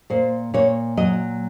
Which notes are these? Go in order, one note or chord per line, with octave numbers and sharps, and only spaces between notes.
A#2 C5
A#2 C#5
F#3 D#5